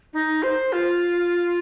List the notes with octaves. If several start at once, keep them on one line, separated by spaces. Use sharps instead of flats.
D#4
C5
F4